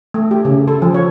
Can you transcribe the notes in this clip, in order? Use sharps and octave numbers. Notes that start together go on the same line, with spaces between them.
A3
G4
C#3
A4
F3
C#5